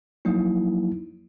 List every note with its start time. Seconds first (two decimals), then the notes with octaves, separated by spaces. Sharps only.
0.25 F3 F#3 A#3 D#4 E4